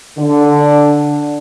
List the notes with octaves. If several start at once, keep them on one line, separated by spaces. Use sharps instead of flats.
D3